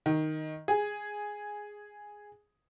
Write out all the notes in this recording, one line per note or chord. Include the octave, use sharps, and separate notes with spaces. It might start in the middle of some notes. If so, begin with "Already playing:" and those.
D#3
G#4